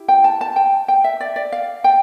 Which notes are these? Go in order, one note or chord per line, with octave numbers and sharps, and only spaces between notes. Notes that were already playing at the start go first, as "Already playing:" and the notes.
Already playing: E4 G4
G5
A5
A5
G5
G5
E5
D5
D5
F5
G5